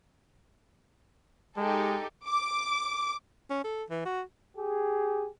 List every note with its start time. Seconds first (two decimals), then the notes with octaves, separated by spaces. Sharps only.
1.57 G#3 D#4 G4 A4
2.27 D6
3.50 C#4
3.64 A4
3.90 E3
4.06 F#4
4.57 G4 G#4